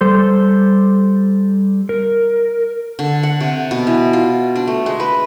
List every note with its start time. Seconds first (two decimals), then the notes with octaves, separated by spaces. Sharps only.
0.01 G3 A4 C5
1.89 A#4
2.99 D3
3.23 F#5
3.41 C3
3.71 B2
3.87 E3
4.13 F4
4.56 D4
4.67 A3
4.86 G#3
5.00 B4